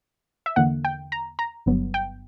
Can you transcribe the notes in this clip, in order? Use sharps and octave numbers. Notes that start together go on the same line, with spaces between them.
E5
E2 D3 A#3 F#5
G5
A#5
A#5
G1 G2 F#3 B3
G5